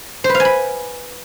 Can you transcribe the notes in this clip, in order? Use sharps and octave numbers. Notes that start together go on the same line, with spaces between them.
C5
B4
F5
G#5
B5